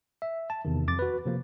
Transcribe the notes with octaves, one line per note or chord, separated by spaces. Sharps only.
E5
A5
E2 C3 D#3
F2 D6 A6
F#4 B4
C3 F3 A#3